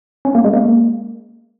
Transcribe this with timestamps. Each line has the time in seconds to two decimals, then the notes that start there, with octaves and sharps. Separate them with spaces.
0.25 C#4
0.35 A#3
0.44 G#3
0.54 A#3